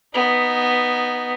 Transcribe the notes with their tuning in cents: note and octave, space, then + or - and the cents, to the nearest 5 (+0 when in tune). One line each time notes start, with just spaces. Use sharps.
B3 +0 D#4 +0